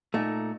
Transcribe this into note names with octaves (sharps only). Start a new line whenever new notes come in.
A#2 A3 D#4